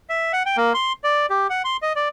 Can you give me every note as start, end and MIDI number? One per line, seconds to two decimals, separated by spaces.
0.10 0.32 76
0.33 0.43 78
0.46 0.57 79
0.57 0.73 58
0.74 0.93 84
1.04 1.26 74
1.30 1.47 67
1.50 1.62 78
1.64 1.77 84
1.82 1.93 75
1.96 2.09 74